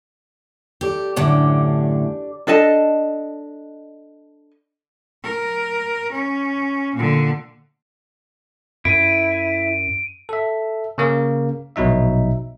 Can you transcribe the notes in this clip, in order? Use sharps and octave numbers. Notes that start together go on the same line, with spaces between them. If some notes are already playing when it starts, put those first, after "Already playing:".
G4 A4 D5
F#2 A2 D3 D4 G4 D6
D4 A4 D#5 A5
A#4
C#4
A#2 D3
F#2 E4 D7 D#7
A4 E5
C#3 A#3 A#4
A#1 B2 F#3 D#4 E5